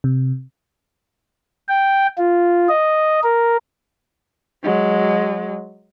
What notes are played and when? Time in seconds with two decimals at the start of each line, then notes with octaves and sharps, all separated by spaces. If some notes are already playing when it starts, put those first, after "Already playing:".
0.04 C3
1.68 G5
2.18 F4
2.69 D#5
3.23 A#4
4.64 F#3 G#3